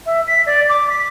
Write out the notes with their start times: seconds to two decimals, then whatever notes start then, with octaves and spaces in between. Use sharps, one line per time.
0.06 E5
0.28 B6
0.46 D5
0.69 D6
0.90 B6